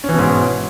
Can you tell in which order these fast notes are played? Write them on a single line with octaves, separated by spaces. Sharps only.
C#4 E3 B2 G#2